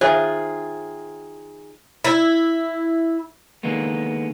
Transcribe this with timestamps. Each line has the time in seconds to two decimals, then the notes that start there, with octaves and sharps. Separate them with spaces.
0.01 D#3 F4 G#4 C5 E5
2.04 E4
3.63 D3 D#3 G#3 A#3 B3